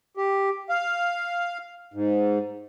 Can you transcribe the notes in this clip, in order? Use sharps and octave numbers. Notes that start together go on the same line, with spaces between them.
G4
F5
G#2